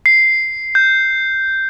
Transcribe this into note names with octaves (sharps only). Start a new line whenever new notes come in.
C7
G6